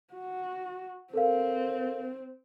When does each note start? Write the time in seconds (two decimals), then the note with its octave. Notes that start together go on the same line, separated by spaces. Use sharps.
0.14 F#4
1.14 C4 A4 A#4 F5